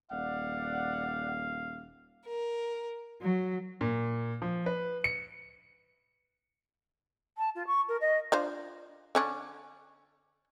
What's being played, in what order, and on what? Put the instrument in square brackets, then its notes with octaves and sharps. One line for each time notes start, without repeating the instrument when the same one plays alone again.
[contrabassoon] D#1 [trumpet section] D5 F#5 [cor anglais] F5
[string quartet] A#4
F#3
[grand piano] A#2
F3
B4
C#7
[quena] A5
F4
C#6
A#4
D#5
[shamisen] D4 F4 C5
D3 C#4 D4